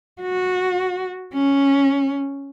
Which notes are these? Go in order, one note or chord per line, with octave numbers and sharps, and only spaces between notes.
F#4
C#4